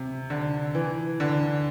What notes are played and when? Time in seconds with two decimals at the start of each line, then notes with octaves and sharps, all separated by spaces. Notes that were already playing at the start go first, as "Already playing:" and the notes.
Already playing: C3
0.30 D3
0.75 E3
1.20 D3